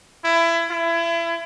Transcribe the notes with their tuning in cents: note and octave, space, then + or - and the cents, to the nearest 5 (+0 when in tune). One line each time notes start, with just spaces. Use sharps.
E4 +25
E4 +30